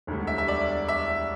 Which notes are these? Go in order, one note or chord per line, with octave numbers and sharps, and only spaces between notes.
E1 D2 D3 G3
E5
E5
D5
E5